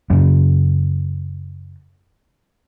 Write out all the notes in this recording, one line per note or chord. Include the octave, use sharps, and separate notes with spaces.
F#2 C#3